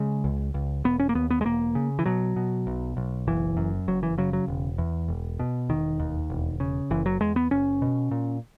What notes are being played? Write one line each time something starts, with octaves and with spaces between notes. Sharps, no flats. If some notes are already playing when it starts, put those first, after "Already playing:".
Already playing: C#3 G#3
C#2
C#2
E1 B3
C#4
A#3
D#2 B3
B3
G#3
E1 A#3
C#3
E3
B2 F#3
B2
B1
B1
F#1 E3
F#2
F#1 F#3
E3
C#3 F#3
F#3
E1
E2
E1
B2
E1 D#3
D#2
E1
C#3
F#1 E3
F#3
E2 G#3
B3
F#1 C#4
B2
A#2